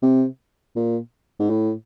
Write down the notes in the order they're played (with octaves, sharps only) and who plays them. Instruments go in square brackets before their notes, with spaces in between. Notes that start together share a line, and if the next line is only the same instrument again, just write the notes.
[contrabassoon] C3
A#2
G#2
A2